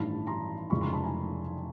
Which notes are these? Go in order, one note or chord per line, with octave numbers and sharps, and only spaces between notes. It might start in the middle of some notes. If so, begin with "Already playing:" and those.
Already playing: A1 G2 D#3 A5 B5
A#5 C6
F1 F2 C#3 E3 G#3 B5 C#6
A#5 C6
A5 B5
G#5 A#5